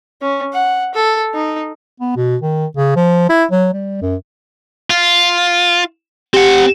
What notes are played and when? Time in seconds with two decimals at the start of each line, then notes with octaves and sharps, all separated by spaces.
0.22 C#4
0.53 F#5
0.95 A4
1.35 D#4
2.00 B3
2.16 B2
2.42 D#3
2.77 C#3
2.96 F3
3.29 E4
3.51 F#3
3.73 G3
4.01 F#2
4.90 F4
6.34 C4 G4 F#5